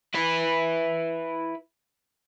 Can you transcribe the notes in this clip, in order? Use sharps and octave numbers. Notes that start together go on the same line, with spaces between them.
E4 B4